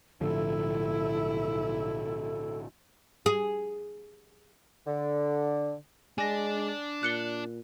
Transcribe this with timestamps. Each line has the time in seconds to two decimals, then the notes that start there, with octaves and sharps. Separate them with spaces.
0.21 B1 A2 D3 F3 E4 A4
3.26 G#4
4.87 D3
6.18 G#3 D4 D5 G#5 A#6
7.03 A#2 F#6 C#7 G7